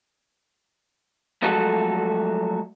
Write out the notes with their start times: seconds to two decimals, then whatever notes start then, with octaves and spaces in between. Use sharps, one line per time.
1.42 F3 F#3 G#3 A3 F#4 A4